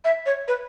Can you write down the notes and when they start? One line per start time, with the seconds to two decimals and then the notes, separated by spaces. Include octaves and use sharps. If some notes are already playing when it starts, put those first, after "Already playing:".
0.05 E5
0.26 C#5
0.48 B4